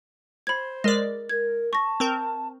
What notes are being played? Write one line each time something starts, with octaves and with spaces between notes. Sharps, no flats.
C5 B5 G#6
G#3 A#4 D5 A#6
A#4 G#6
A5 C#6 A#6
C4 A#4